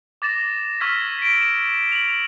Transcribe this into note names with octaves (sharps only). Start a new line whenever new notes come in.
D6 A6 A#6 E7
C#6 E6 F6 G#6 A#6 B6
B6 D7
E7
F7 F#7